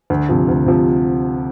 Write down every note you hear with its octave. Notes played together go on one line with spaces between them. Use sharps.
D2
C3 F3
D2
C3 F3